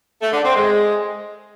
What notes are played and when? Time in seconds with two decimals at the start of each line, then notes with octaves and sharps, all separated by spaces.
0.21 A3
0.33 D3
0.44 C4
0.56 G#3